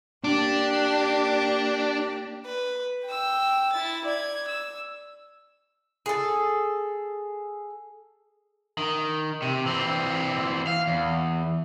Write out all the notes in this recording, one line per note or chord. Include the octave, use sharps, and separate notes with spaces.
A#3 D4 G4
B4
G5 E6
E4 A6
D5 G#6
E6
G#4 A4
D#3
C3
E3 C4
F5
E2